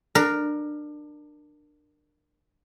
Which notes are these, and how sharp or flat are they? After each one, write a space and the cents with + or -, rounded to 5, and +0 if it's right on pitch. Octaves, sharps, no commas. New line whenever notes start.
D4 +25 A#4 +0